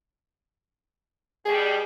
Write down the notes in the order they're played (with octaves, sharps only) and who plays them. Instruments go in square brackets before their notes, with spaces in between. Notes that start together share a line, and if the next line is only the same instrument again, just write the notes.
[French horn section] B2 G3 [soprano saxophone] G#4